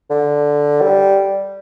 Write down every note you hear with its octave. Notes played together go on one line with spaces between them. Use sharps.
D3
G3